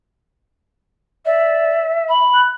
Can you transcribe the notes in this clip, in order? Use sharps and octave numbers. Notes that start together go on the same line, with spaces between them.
D5 E5
B5
F#6